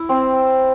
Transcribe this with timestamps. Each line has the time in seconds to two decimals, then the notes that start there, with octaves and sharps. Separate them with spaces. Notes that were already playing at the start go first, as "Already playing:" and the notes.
Already playing: E4
0.09 C4